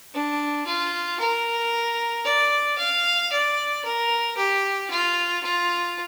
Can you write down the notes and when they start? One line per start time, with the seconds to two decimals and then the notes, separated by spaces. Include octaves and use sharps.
0.14 D4
0.66 F4
1.19 A#4
2.25 D5
2.78 F5
3.32 D5
3.84 A#4
4.37 G4
4.90 F4
5.43 F4